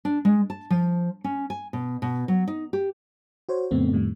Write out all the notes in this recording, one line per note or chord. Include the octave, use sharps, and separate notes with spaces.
D4
G#3
A5
F3
C#4
G#5
B2
B2
F#3
D#4
G4
F#4 C5 C#5
F2 A2 C#3 A3 B3 C4
F2 A2 D#3 G3